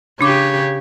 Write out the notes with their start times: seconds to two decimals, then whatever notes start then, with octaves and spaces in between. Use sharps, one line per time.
0.21 C#3 D4 G4 C#5 D6